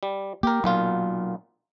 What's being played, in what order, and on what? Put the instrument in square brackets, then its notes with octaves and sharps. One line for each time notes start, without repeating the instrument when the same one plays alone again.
[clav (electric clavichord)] G3
[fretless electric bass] A#3 [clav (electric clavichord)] G4 A#4
[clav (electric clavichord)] B1 A#2 F4 [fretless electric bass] F#3